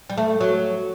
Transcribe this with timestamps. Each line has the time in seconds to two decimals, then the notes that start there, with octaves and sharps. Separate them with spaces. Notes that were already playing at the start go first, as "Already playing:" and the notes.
0.10 G3
0.18 A3
0.41 F#3